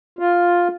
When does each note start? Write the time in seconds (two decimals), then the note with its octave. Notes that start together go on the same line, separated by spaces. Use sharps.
0.19 F4